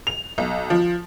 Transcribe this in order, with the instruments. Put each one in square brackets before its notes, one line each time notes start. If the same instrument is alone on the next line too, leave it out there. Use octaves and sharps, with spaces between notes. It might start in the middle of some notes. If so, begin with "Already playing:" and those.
[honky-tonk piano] F7
B1
F3